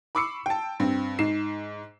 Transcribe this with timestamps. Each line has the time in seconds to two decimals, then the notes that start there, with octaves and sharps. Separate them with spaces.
0.15 B5 C#6 D6 E6 C7 C#7
0.46 G5 A5
0.80 G2 C4
1.19 G#2 C7 E7